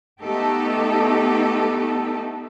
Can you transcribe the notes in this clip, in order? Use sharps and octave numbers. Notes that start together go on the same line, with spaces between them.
A3 B3 D#4 G4 A4